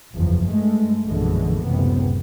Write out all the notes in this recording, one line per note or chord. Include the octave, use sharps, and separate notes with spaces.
F#1 E2 F3
G2 G#3 A3
A#1 F#2 B2 D3 E3 G#3
F#1 C#2 A2 C3 B3